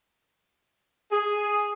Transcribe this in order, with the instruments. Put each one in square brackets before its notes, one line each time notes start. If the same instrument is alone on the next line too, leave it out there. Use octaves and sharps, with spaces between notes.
[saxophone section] G#4